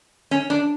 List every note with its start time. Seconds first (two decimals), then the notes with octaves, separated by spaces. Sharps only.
0.31 C#4
0.50 D4